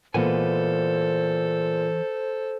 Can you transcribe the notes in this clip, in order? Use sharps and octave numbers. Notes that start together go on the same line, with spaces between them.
A#2 E3 G#3 B3 A4 C5 G#5